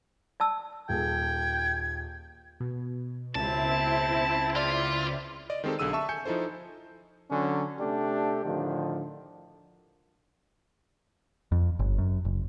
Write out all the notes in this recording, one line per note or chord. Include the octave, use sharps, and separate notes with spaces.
D5 A5 E6
D#1 G#4 G5 G#6
B2
C#2 C4 E4 A5
F4 D5
D5 D#5
D#3 G#3 C4 G4 A4
B1 D3 G#4 E6 D#7
E5 A5 C#6 E6
G#5 G6 C#7
F3 D#4 E4 A4 C5
D3 F#3 C#4
C3 A3 D4 G4
A2 D3 D#3 F3
F2
G1
F#2
F#1